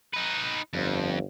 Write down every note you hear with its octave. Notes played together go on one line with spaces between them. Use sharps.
D#4 B4
G1 F2